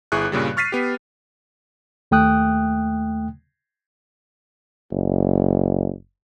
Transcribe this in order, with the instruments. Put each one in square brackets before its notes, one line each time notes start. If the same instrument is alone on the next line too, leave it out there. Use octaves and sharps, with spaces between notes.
[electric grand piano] G1 E4 G#4 C#6 F#6
G2 A#2 C#3 G3
C#6 F6 A6 B6 C7 D#7
B3 G4
[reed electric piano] D#2 A3 G5 D#6 F#6
[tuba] F#1